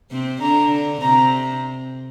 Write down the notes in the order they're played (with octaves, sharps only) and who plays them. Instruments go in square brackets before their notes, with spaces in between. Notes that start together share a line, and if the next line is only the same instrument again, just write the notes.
[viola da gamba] C3 C4
[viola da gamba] D3 D4 [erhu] A#5
[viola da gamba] C3 C4 [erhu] A#5